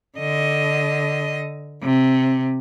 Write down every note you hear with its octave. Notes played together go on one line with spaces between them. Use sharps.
D3 D#5
C3